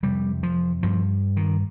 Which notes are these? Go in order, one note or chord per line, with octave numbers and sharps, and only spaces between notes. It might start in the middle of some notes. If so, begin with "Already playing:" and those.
F2 C3 G3
F3
G2 F3
D#3